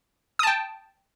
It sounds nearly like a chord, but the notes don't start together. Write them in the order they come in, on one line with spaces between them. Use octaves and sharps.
D#6 A5 G5